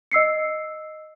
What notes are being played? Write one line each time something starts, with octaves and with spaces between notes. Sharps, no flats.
D#5 E6 C7 C#7